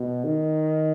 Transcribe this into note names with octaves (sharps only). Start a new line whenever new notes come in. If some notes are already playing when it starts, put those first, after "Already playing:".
Already playing: B2
D#3